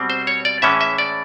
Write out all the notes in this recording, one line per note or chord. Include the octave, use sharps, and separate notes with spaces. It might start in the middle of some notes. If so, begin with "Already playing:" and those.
Already playing: B2 G3 C4
C5
C#5
D5
A2 E3 G#3 C#4 E5
E5
D5